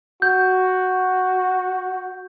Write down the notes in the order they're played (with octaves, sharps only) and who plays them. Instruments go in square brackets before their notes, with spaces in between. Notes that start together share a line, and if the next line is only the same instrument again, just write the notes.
[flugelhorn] F#4 [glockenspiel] G6